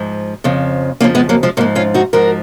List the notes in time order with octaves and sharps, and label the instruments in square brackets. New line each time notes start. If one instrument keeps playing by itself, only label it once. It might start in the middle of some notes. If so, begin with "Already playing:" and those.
Already playing: [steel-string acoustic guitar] G#2 F3
F2 C#3 F3
F2 C#3 F3 A#3 C#4
G#3 B3
F#3 A#3
F3 G#3
G#2 F#3 A#3
F3
C#4 F4
D#4 F#4
G#2 F3 F#4 A#4